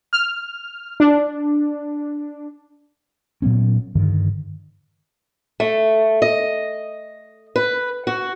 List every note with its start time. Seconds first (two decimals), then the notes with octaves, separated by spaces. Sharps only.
0.13 F6
1.00 D4
3.42 A#2 F#3 B3 C#4
3.95 G2 D3 D#3
5.60 A3
6.22 D#5
7.56 B4
8.07 F#4